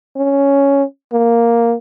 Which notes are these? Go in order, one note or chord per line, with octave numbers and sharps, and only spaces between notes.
C#4
A#3